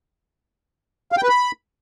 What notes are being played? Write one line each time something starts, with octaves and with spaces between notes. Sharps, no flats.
F5
G5
B4
B5